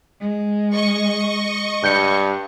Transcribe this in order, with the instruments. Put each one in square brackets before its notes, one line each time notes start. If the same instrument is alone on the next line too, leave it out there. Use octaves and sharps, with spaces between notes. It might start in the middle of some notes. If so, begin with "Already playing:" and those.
[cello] G#3
[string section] D#5 C#6
[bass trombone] G2 [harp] G6 C#7